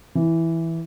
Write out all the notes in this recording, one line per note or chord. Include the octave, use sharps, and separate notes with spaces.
E3